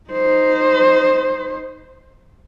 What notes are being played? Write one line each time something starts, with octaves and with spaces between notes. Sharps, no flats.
D#4 C5